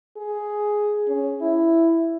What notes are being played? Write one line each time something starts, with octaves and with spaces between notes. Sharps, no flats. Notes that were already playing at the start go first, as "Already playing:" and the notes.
G#4
C#4
E4